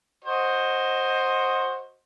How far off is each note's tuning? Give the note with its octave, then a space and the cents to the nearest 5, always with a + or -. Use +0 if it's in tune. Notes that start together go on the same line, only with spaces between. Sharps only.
F#4 +0 C5 +15 D#5 +0